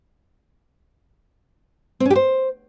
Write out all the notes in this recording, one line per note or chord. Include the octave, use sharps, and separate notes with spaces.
C4
C#4
G4
C5